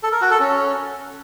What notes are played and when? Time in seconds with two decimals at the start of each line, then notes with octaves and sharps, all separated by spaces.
0.03 A4
0.12 A#4
0.21 F#4
0.31 A4
0.40 C#4